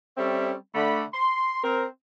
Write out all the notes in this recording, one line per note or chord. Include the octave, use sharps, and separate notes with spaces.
G3 C4 C#4 A4 C#5 E5
D3 A3 B5
C6
C4 A#4